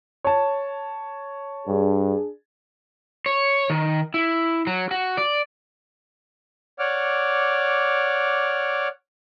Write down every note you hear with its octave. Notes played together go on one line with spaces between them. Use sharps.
C#5 A5
G2 D4 G#4
C#5
D#3
E4
F#3
F#4
D5
C#5 D5 F#5 D6 F6